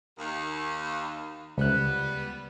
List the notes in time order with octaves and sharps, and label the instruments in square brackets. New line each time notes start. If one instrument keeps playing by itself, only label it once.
[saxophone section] D#2
[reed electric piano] C#2 F#6 [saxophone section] G3 B3